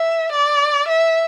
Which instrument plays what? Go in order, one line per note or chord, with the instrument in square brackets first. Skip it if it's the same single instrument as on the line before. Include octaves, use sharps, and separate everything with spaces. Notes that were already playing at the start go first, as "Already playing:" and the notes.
Already playing: [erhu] E5
D5
E5